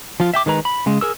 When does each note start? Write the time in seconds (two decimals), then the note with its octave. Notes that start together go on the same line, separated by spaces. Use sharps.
0.20 F3 F4
0.34 E5 G5 D6
0.46 D#3 G#3 B4 A#5 F#6
0.65 B5
0.86 C#3 G#3
1.01 G#4 A#4 E6